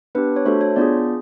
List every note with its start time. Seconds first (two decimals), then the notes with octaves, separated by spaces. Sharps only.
0.15 B3 D4 G4 B4
0.36 C#5
0.45 A3 D4 F#4 A4 C5
0.61 C#5
0.76 B3 D4 F4 G#4 D5